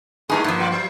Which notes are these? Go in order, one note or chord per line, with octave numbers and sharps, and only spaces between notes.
G#2 G3 A#3 D#4 G#4 B4 C6
G2 F3
B3 F4 D5
F#3 F4 C5 C#6